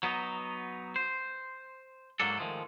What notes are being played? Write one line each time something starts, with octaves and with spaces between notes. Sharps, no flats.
F#3 B3 D#4
C5
G#2 F#3 A#3 D4 A4
D#3 F3 G#3 A3